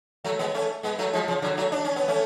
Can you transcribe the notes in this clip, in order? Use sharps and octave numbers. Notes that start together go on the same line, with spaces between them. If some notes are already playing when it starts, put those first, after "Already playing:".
F#3 A3
G#3 B3
A3 C#4
G#3 B3
F#3 A3
F3 G#3
C#3 F3
D3 F#3
F#3 A3
D4
C#4
B3
A3 C#4